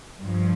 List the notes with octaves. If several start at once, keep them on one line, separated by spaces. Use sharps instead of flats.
G2 F3